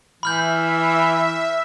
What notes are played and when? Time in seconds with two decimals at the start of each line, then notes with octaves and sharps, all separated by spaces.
0.23 E3 E5 B5 F6 G6